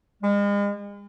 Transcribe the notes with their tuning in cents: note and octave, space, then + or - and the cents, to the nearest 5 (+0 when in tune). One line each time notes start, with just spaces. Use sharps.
G#3 -40